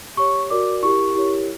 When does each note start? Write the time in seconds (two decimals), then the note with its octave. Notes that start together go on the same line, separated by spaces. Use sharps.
0.17 G4 C#5 C#6
0.50 F#4 A#4 D5 D6
0.83 E4 G4 A#4 C#6
1.15 E4 G4 A#4 C#5